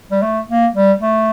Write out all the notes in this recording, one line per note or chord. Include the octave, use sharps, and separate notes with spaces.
G3
A3
A#3
G3
A3